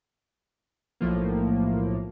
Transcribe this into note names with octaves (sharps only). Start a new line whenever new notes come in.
B1 A2 F3 A#3